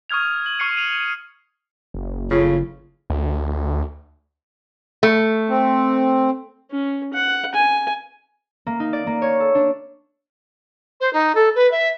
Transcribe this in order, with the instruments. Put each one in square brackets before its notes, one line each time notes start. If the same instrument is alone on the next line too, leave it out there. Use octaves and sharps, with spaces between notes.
[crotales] C#6 D#6 F6 G#6 F7
F#7
C#6 F6 C7 C#7 D#7
D#7 F7
[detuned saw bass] F#1
[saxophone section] A2 C#3 [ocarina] F4
[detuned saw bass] D2
[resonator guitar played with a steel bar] A3
[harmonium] C4
[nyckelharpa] C#4
F#5
G#5
[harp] A#3
D#4
D5
A#3
C#5
A4
D4
[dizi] C5
D#4
A4
B4
E5